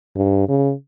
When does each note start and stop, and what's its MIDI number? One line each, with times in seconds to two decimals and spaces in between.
0.16 0.44 43
0.49 0.72 49